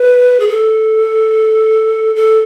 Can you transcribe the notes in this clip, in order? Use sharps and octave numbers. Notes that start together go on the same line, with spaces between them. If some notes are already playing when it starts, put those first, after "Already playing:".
Already playing: B4
G#4
A4
A4